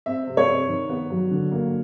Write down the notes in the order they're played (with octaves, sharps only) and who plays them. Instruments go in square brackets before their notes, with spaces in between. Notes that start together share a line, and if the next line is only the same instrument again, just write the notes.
[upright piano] C4 E5
C3
C#5
C3
D#3
B3
F#3
D3
A#3